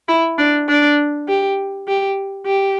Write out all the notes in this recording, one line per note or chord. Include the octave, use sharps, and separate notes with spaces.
E4
D4
D4
G4
G4
G4